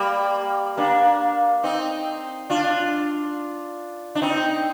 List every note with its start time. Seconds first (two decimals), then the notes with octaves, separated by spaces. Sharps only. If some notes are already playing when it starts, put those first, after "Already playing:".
Already playing: G3 A#3
0.77 A#3 D4
1.63 C4 D#4
2.50 D4 F4
4.15 D4
4.22 C4 D#4